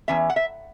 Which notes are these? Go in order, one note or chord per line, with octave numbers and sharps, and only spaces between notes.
E2 E3 C#4 E5
F#5
E5